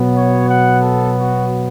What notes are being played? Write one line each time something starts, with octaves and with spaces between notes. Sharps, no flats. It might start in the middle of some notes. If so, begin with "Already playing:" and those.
Already playing: B2 F#3 B3
C#5
F#5
A4
F#4